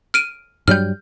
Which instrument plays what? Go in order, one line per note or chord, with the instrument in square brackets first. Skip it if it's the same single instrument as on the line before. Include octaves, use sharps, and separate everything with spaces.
[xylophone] F6 D7 D#7
[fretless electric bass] G2 F#3 G3 [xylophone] F6 G6